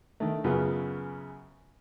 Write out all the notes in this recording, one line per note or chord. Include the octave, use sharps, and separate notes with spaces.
D#3 A3
F#2 C#3 B3 F4